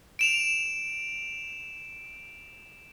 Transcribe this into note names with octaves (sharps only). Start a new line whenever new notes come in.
D7 E7 F7